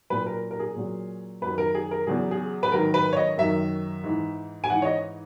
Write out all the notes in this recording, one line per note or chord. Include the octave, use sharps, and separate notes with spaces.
A#2 F#3 B4
A#4
A#4
G#4
A#2 F#3
F#2 D#3 F#3 B4
A#4
G#4
A#4
E2 C#3 F#3 G#4
G#4
B4
G#2 D#3 F#3 A#4
B4
C#5
D#5
F#2 D#3 F#3 E5
G#2 E3
G#5
G#2 E3 F#5
C#5
D#5